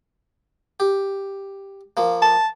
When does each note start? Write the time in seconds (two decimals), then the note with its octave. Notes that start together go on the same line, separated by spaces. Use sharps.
0.80 G4
1.97 F3 A#3
2.22 A5